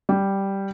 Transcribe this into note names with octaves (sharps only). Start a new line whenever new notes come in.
G3